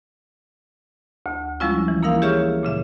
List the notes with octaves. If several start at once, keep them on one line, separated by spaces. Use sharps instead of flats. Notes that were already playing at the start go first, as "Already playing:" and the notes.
D2
F3 G3 G#3 C#4 E4 F4
E3
A#3 D#4 E4 A#4 F5
G4 G#4 C#5 E5 C#6 F6
A#2 C#3 E5